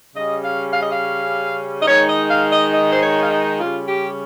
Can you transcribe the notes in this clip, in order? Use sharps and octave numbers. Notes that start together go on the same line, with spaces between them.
C#3 G3 C#4 D#5
F5
F5
D#5
F5
D#5
D#3 G#3 D#4 C#5
D#5
F5
D#5
D#5
C5
C#5
F5
D#5
C#3 G3 C#4 F4
G4